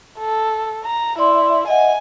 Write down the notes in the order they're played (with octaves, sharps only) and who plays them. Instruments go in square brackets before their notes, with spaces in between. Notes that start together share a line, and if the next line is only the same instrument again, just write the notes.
[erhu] A4
A#5
[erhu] E4 [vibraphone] D5 E5 C6
[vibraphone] D#5 E5 F#5 [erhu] G#5